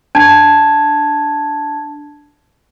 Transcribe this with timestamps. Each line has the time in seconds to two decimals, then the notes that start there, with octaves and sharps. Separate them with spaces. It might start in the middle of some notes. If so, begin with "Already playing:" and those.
0.15 D4 A5 G#6